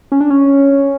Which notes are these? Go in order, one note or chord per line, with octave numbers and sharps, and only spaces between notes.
C#4
D4
C#4